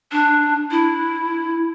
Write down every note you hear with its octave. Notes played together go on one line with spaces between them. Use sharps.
D4
E4